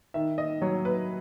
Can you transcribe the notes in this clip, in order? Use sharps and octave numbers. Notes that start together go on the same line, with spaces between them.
D#3 E5
D#5
F#3 C#5
B4